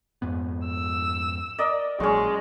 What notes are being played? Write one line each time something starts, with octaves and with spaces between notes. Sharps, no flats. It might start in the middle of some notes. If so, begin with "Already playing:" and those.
F2 G#2 B3
E6
A#4 D5 D#5
A#1 A#2 F#3 G#3 C#4 C#6